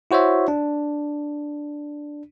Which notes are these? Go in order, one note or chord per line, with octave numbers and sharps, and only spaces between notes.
E4 F#4 C5 C#5 E5
D4